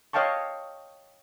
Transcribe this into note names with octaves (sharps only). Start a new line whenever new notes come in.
C#5 D#5 F5 G5 A5 C#6